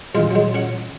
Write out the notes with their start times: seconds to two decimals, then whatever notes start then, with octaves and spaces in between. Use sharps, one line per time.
0.15 A1 A#2 G#3 F4
0.31 F#3 G#3
0.54 C#4 F#5